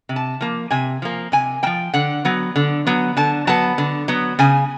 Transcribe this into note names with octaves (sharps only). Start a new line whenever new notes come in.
C3
A5
F3 A#3
C3 G#5
F3 A#3
C3 G#5
F3 A#3 G5
D3 F#5
F#3 B3
D3
F#3 B3
D3 A5
F#3 B3 A5
D3
F#3 B3
C#3 G#5